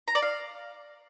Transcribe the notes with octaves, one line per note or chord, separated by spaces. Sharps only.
A#5
D5
F5